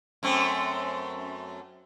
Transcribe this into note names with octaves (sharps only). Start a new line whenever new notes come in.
F#2 A3 C4